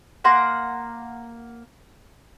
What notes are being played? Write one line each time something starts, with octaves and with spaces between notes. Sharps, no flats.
A#3 F#5 A#5 C6